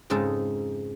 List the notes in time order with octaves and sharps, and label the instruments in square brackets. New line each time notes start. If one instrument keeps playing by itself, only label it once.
[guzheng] F2 G#2 C#3 G#3 D#4 A4